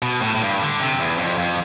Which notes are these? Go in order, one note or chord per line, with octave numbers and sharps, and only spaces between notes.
B2
A2
A2
G2
D3
C3
F2
E2
F2
F2